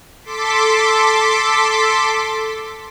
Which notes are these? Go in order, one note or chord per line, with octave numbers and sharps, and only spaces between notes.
A4 C6 D6 B6